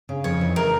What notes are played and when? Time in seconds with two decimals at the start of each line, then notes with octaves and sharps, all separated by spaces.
0.09 C#3
0.24 F2 C#5
0.41 E3
0.56 A3 A#4